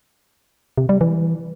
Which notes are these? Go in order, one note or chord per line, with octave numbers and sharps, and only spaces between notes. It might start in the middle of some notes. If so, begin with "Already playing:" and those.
C3
G3
E3